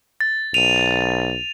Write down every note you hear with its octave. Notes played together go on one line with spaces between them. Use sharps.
A6
B1 D#7 F7